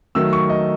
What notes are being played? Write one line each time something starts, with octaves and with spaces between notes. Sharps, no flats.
D#3 F#3 A3 E6
C#6
D#5